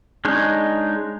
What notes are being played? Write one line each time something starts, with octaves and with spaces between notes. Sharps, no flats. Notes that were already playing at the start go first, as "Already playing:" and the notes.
G#3 D4 D#4 C#5